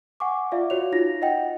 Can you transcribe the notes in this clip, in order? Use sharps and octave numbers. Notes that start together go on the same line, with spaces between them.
F#5 G#5 C#6 D6
F4 D5 E5 F5
F#4 C#5 F7
D#4 F4 A#6
D#5 F#5 G5